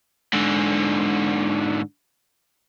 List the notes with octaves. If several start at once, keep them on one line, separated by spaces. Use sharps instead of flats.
G#2 D3